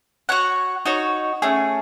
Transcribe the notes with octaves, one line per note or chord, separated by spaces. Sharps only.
F#4 C#5 F#5
D#4 F#4 C#5
A3 C#4 G#4